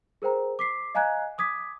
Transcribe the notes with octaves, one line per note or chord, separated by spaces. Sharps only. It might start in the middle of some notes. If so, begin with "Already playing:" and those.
G#4 A#4 C5 G5 A#5
D6 B6 C7
D#5 F5 G#5 A#5 F#6 G#6
D6 D#6 G#6 B6